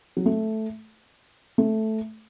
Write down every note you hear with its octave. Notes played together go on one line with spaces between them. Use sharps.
F#3
A3
A3